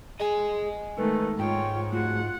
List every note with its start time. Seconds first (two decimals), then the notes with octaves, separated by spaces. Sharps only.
0.20 G#4 D#5 G#5
0.98 D#3 G#3 A3 B3 A4 B4
1.39 G#2 F4 C#5 G5
1.93 A3 F4 F#4 G#4 F#5